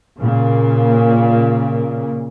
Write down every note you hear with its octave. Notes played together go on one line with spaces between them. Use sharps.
A#2 C#3 A#3